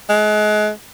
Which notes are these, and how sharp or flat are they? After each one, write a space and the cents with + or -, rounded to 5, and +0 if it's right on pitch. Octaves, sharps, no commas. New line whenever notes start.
G#3 +35